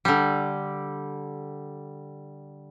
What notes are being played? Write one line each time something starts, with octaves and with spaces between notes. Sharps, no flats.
D3 G3